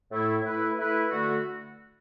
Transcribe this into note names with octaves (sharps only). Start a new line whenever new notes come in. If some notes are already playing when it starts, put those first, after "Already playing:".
A2 A3 E4
A3 E4 B4
A3 E4 B4
D3 A3 F#4